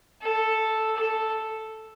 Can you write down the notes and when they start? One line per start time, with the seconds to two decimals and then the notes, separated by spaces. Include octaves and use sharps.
0.21 A4
0.96 A4